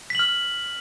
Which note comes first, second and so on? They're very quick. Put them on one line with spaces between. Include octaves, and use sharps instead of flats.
B6 F#7 F6